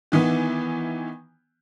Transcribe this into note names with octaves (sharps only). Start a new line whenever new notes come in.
D#3 E3 B3